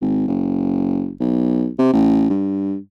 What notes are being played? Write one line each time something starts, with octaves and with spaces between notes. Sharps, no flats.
G#1
F#1
B1
C3
A1
G2